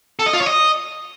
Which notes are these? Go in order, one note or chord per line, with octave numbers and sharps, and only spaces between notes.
A4
D#5
F4
C#5
D#5